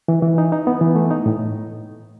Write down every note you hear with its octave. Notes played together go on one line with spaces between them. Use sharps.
E3
E3
D#4
D#4
B3
E3
A3
D#4
A2